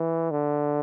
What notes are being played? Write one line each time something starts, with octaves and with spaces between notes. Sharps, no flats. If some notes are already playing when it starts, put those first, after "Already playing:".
Already playing: E3
D3